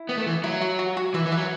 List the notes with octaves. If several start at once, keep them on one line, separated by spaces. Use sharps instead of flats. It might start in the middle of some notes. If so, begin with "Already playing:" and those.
Already playing: E4
B3
A3
E3
F#3 E4
F#4
F#4
F#4
E3 B4 E5
E3
B4 E5
F#3